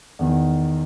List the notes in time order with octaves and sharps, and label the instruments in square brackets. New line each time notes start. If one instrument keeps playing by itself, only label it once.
[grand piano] E2 D#3